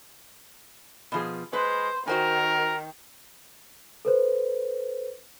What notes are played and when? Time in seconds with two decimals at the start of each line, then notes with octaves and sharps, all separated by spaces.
1.12 B2 F3 G#4
1.53 G#3 B4 C5
2.08 D#3 F#4 A#4 C5 G#5
4.05 A4 B4 C5